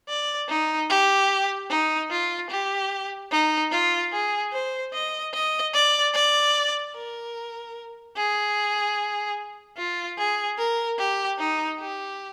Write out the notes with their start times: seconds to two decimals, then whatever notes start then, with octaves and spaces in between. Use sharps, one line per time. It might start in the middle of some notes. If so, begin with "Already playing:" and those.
0.09 D5
0.49 D#4
0.89 G4
1.70 D#4
2.11 F4
2.50 G4
3.32 D#4
3.72 F4
4.12 G#4
4.52 C5
4.93 D#5
5.34 D#5
5.74 D5
6.14 D5
6.95 A#4
8.16 G#4
9.77 F4
10.18 G#4
10.58 A#4
10.99 G4
11.39 D#4
11.79 G4